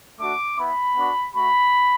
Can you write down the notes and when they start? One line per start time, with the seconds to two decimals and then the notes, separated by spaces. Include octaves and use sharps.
0.19 A3 D4 F#4 D6
0.57 B3 E4 B5
0.96 B3 D4 F#4
1.34 A3 F#4 B5